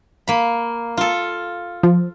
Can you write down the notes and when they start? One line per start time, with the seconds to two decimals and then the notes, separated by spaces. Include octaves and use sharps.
0.27 A#3 B5
0.97 F4 A4
1.83 F3